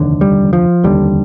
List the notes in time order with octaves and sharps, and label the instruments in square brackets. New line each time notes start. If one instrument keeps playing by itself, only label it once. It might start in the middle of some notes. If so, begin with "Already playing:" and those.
Already playing: [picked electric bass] F1 D#2 D3
G3
F3
F1 D#2 D3 G3